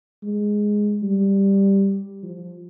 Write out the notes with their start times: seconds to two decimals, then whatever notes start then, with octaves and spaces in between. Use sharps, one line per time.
0.23 G#3
1.03 G3
2.23 F3